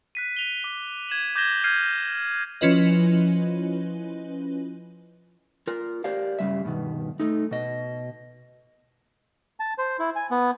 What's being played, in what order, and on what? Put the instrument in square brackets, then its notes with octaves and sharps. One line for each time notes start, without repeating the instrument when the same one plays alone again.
[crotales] F#6 B6 D#7
D#7 F7 G7
D6
G#6 E7 F#7
D6 G6 G#6 A#6 E7 G7
F6 G6 G#6 C7 D#7
[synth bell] F3 C#4 E4 F4 B4 D#5
[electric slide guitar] F4 A#4
G4 A#4 C5 D5 F5
G2 C#3 G3 E5
G2 B2 D#3
A3 D#4
B2 D#5
[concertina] A5
C5
E4
G#5
B3